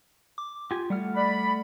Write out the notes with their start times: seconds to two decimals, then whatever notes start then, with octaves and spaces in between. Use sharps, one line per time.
0.38 D6
0.71 F4 G4 G#5
0.90 G3 A3 F#5 F6
1.15 D5 B5